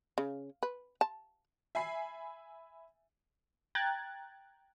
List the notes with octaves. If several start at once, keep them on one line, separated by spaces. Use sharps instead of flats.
C#3
B4
A5
E5 G#5 B5 C7
G5 A#5 F#6 G#6 A6